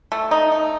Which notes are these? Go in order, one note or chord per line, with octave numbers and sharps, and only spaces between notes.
A3
D#4
D#4